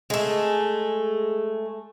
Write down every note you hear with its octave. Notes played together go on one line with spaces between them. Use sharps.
G#3 A3